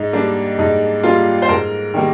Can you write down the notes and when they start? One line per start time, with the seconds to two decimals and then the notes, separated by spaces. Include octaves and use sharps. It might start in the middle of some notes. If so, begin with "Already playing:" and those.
Already playing: G#2 D#4
0.13 G3 A#3 D4
0.59 G#2 D#4
1.03 G3 A#3 F4
1.42 C5
1.49 G#2 A#4
1.94 D#3 G3 A#3